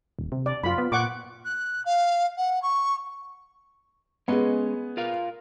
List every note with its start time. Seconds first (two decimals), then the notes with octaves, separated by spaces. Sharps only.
0.19 D#1
0.32 C3
0.46 D5
0.64 F#2 F4 B5
0.78 B3
0.92 A#2 F#5 C#6 D6
1.45 F#6
1.85 F5
2.37 F#5
2.62 C#6
4.28 G#3 B3 C#4 G#4 D#5
4.97 F4 A#4 F5